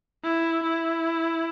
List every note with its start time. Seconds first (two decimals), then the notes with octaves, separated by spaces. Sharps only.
0.24 E4
0.64 E4